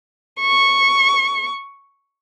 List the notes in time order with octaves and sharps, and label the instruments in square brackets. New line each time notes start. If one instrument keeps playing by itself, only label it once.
[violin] C#6